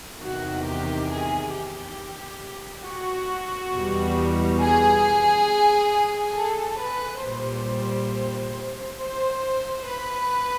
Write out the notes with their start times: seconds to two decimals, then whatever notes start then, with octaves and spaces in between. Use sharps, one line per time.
0.22 E2 C3 D#3 F#4
0.65 G4
1.10 G#4
1.54 G4
2.84 F#4
3.73 E2 B2 G3
4.61 G#4
6.35 A4
6.78 B4
7.22 A#2 G3 C5
8.98 C5
9.86 B4